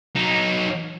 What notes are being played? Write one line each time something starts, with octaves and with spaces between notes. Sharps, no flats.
F#3 D#4